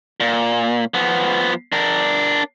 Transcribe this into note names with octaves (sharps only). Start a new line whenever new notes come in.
A#2
F3 B3
D4 A#4